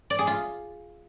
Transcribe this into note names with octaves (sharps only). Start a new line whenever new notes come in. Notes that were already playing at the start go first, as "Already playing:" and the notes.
D5
G#4
F4